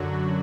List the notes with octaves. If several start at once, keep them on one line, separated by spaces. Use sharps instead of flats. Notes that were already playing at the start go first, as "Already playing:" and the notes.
Already playing: F#2 D3 F#3 F#4